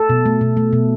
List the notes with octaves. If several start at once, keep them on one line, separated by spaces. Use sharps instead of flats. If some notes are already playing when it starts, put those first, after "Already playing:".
Already playing: A4
B2
A3
B2
A3
B2